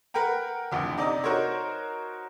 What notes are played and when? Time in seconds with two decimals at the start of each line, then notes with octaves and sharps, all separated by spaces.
0.14 A#4 B4 F#5 G5 A#5
0.71 A1 F2 D3
0.97 C3 D#4 D5 A#5 D#6
1.24 D#4 F#4 A#4 C5 C#5